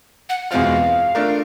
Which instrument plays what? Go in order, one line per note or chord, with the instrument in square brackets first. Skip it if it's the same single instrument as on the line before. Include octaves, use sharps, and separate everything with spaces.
[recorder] F#5
[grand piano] E2 B2 G#3 C4 F4 [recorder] F5
[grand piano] A3 D4 F4 A#4